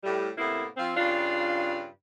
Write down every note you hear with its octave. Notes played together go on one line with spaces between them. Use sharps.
A2 G3
A2 C3 A#3 B3 E4
F3 C4
G2 C#3 D4 F4